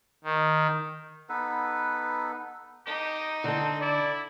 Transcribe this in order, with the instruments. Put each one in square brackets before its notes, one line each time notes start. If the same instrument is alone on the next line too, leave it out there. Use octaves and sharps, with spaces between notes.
[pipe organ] D#3
[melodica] B3 D#4 A4 B4
[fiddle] D#4 [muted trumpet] G4
[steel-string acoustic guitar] D3 A5 [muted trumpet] C4
[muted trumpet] E4 [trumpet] D5